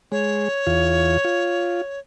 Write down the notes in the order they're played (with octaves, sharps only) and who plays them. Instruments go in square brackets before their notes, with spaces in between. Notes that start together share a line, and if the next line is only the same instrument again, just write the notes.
[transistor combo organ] G#3 [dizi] C#5
[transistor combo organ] E2 F4
F4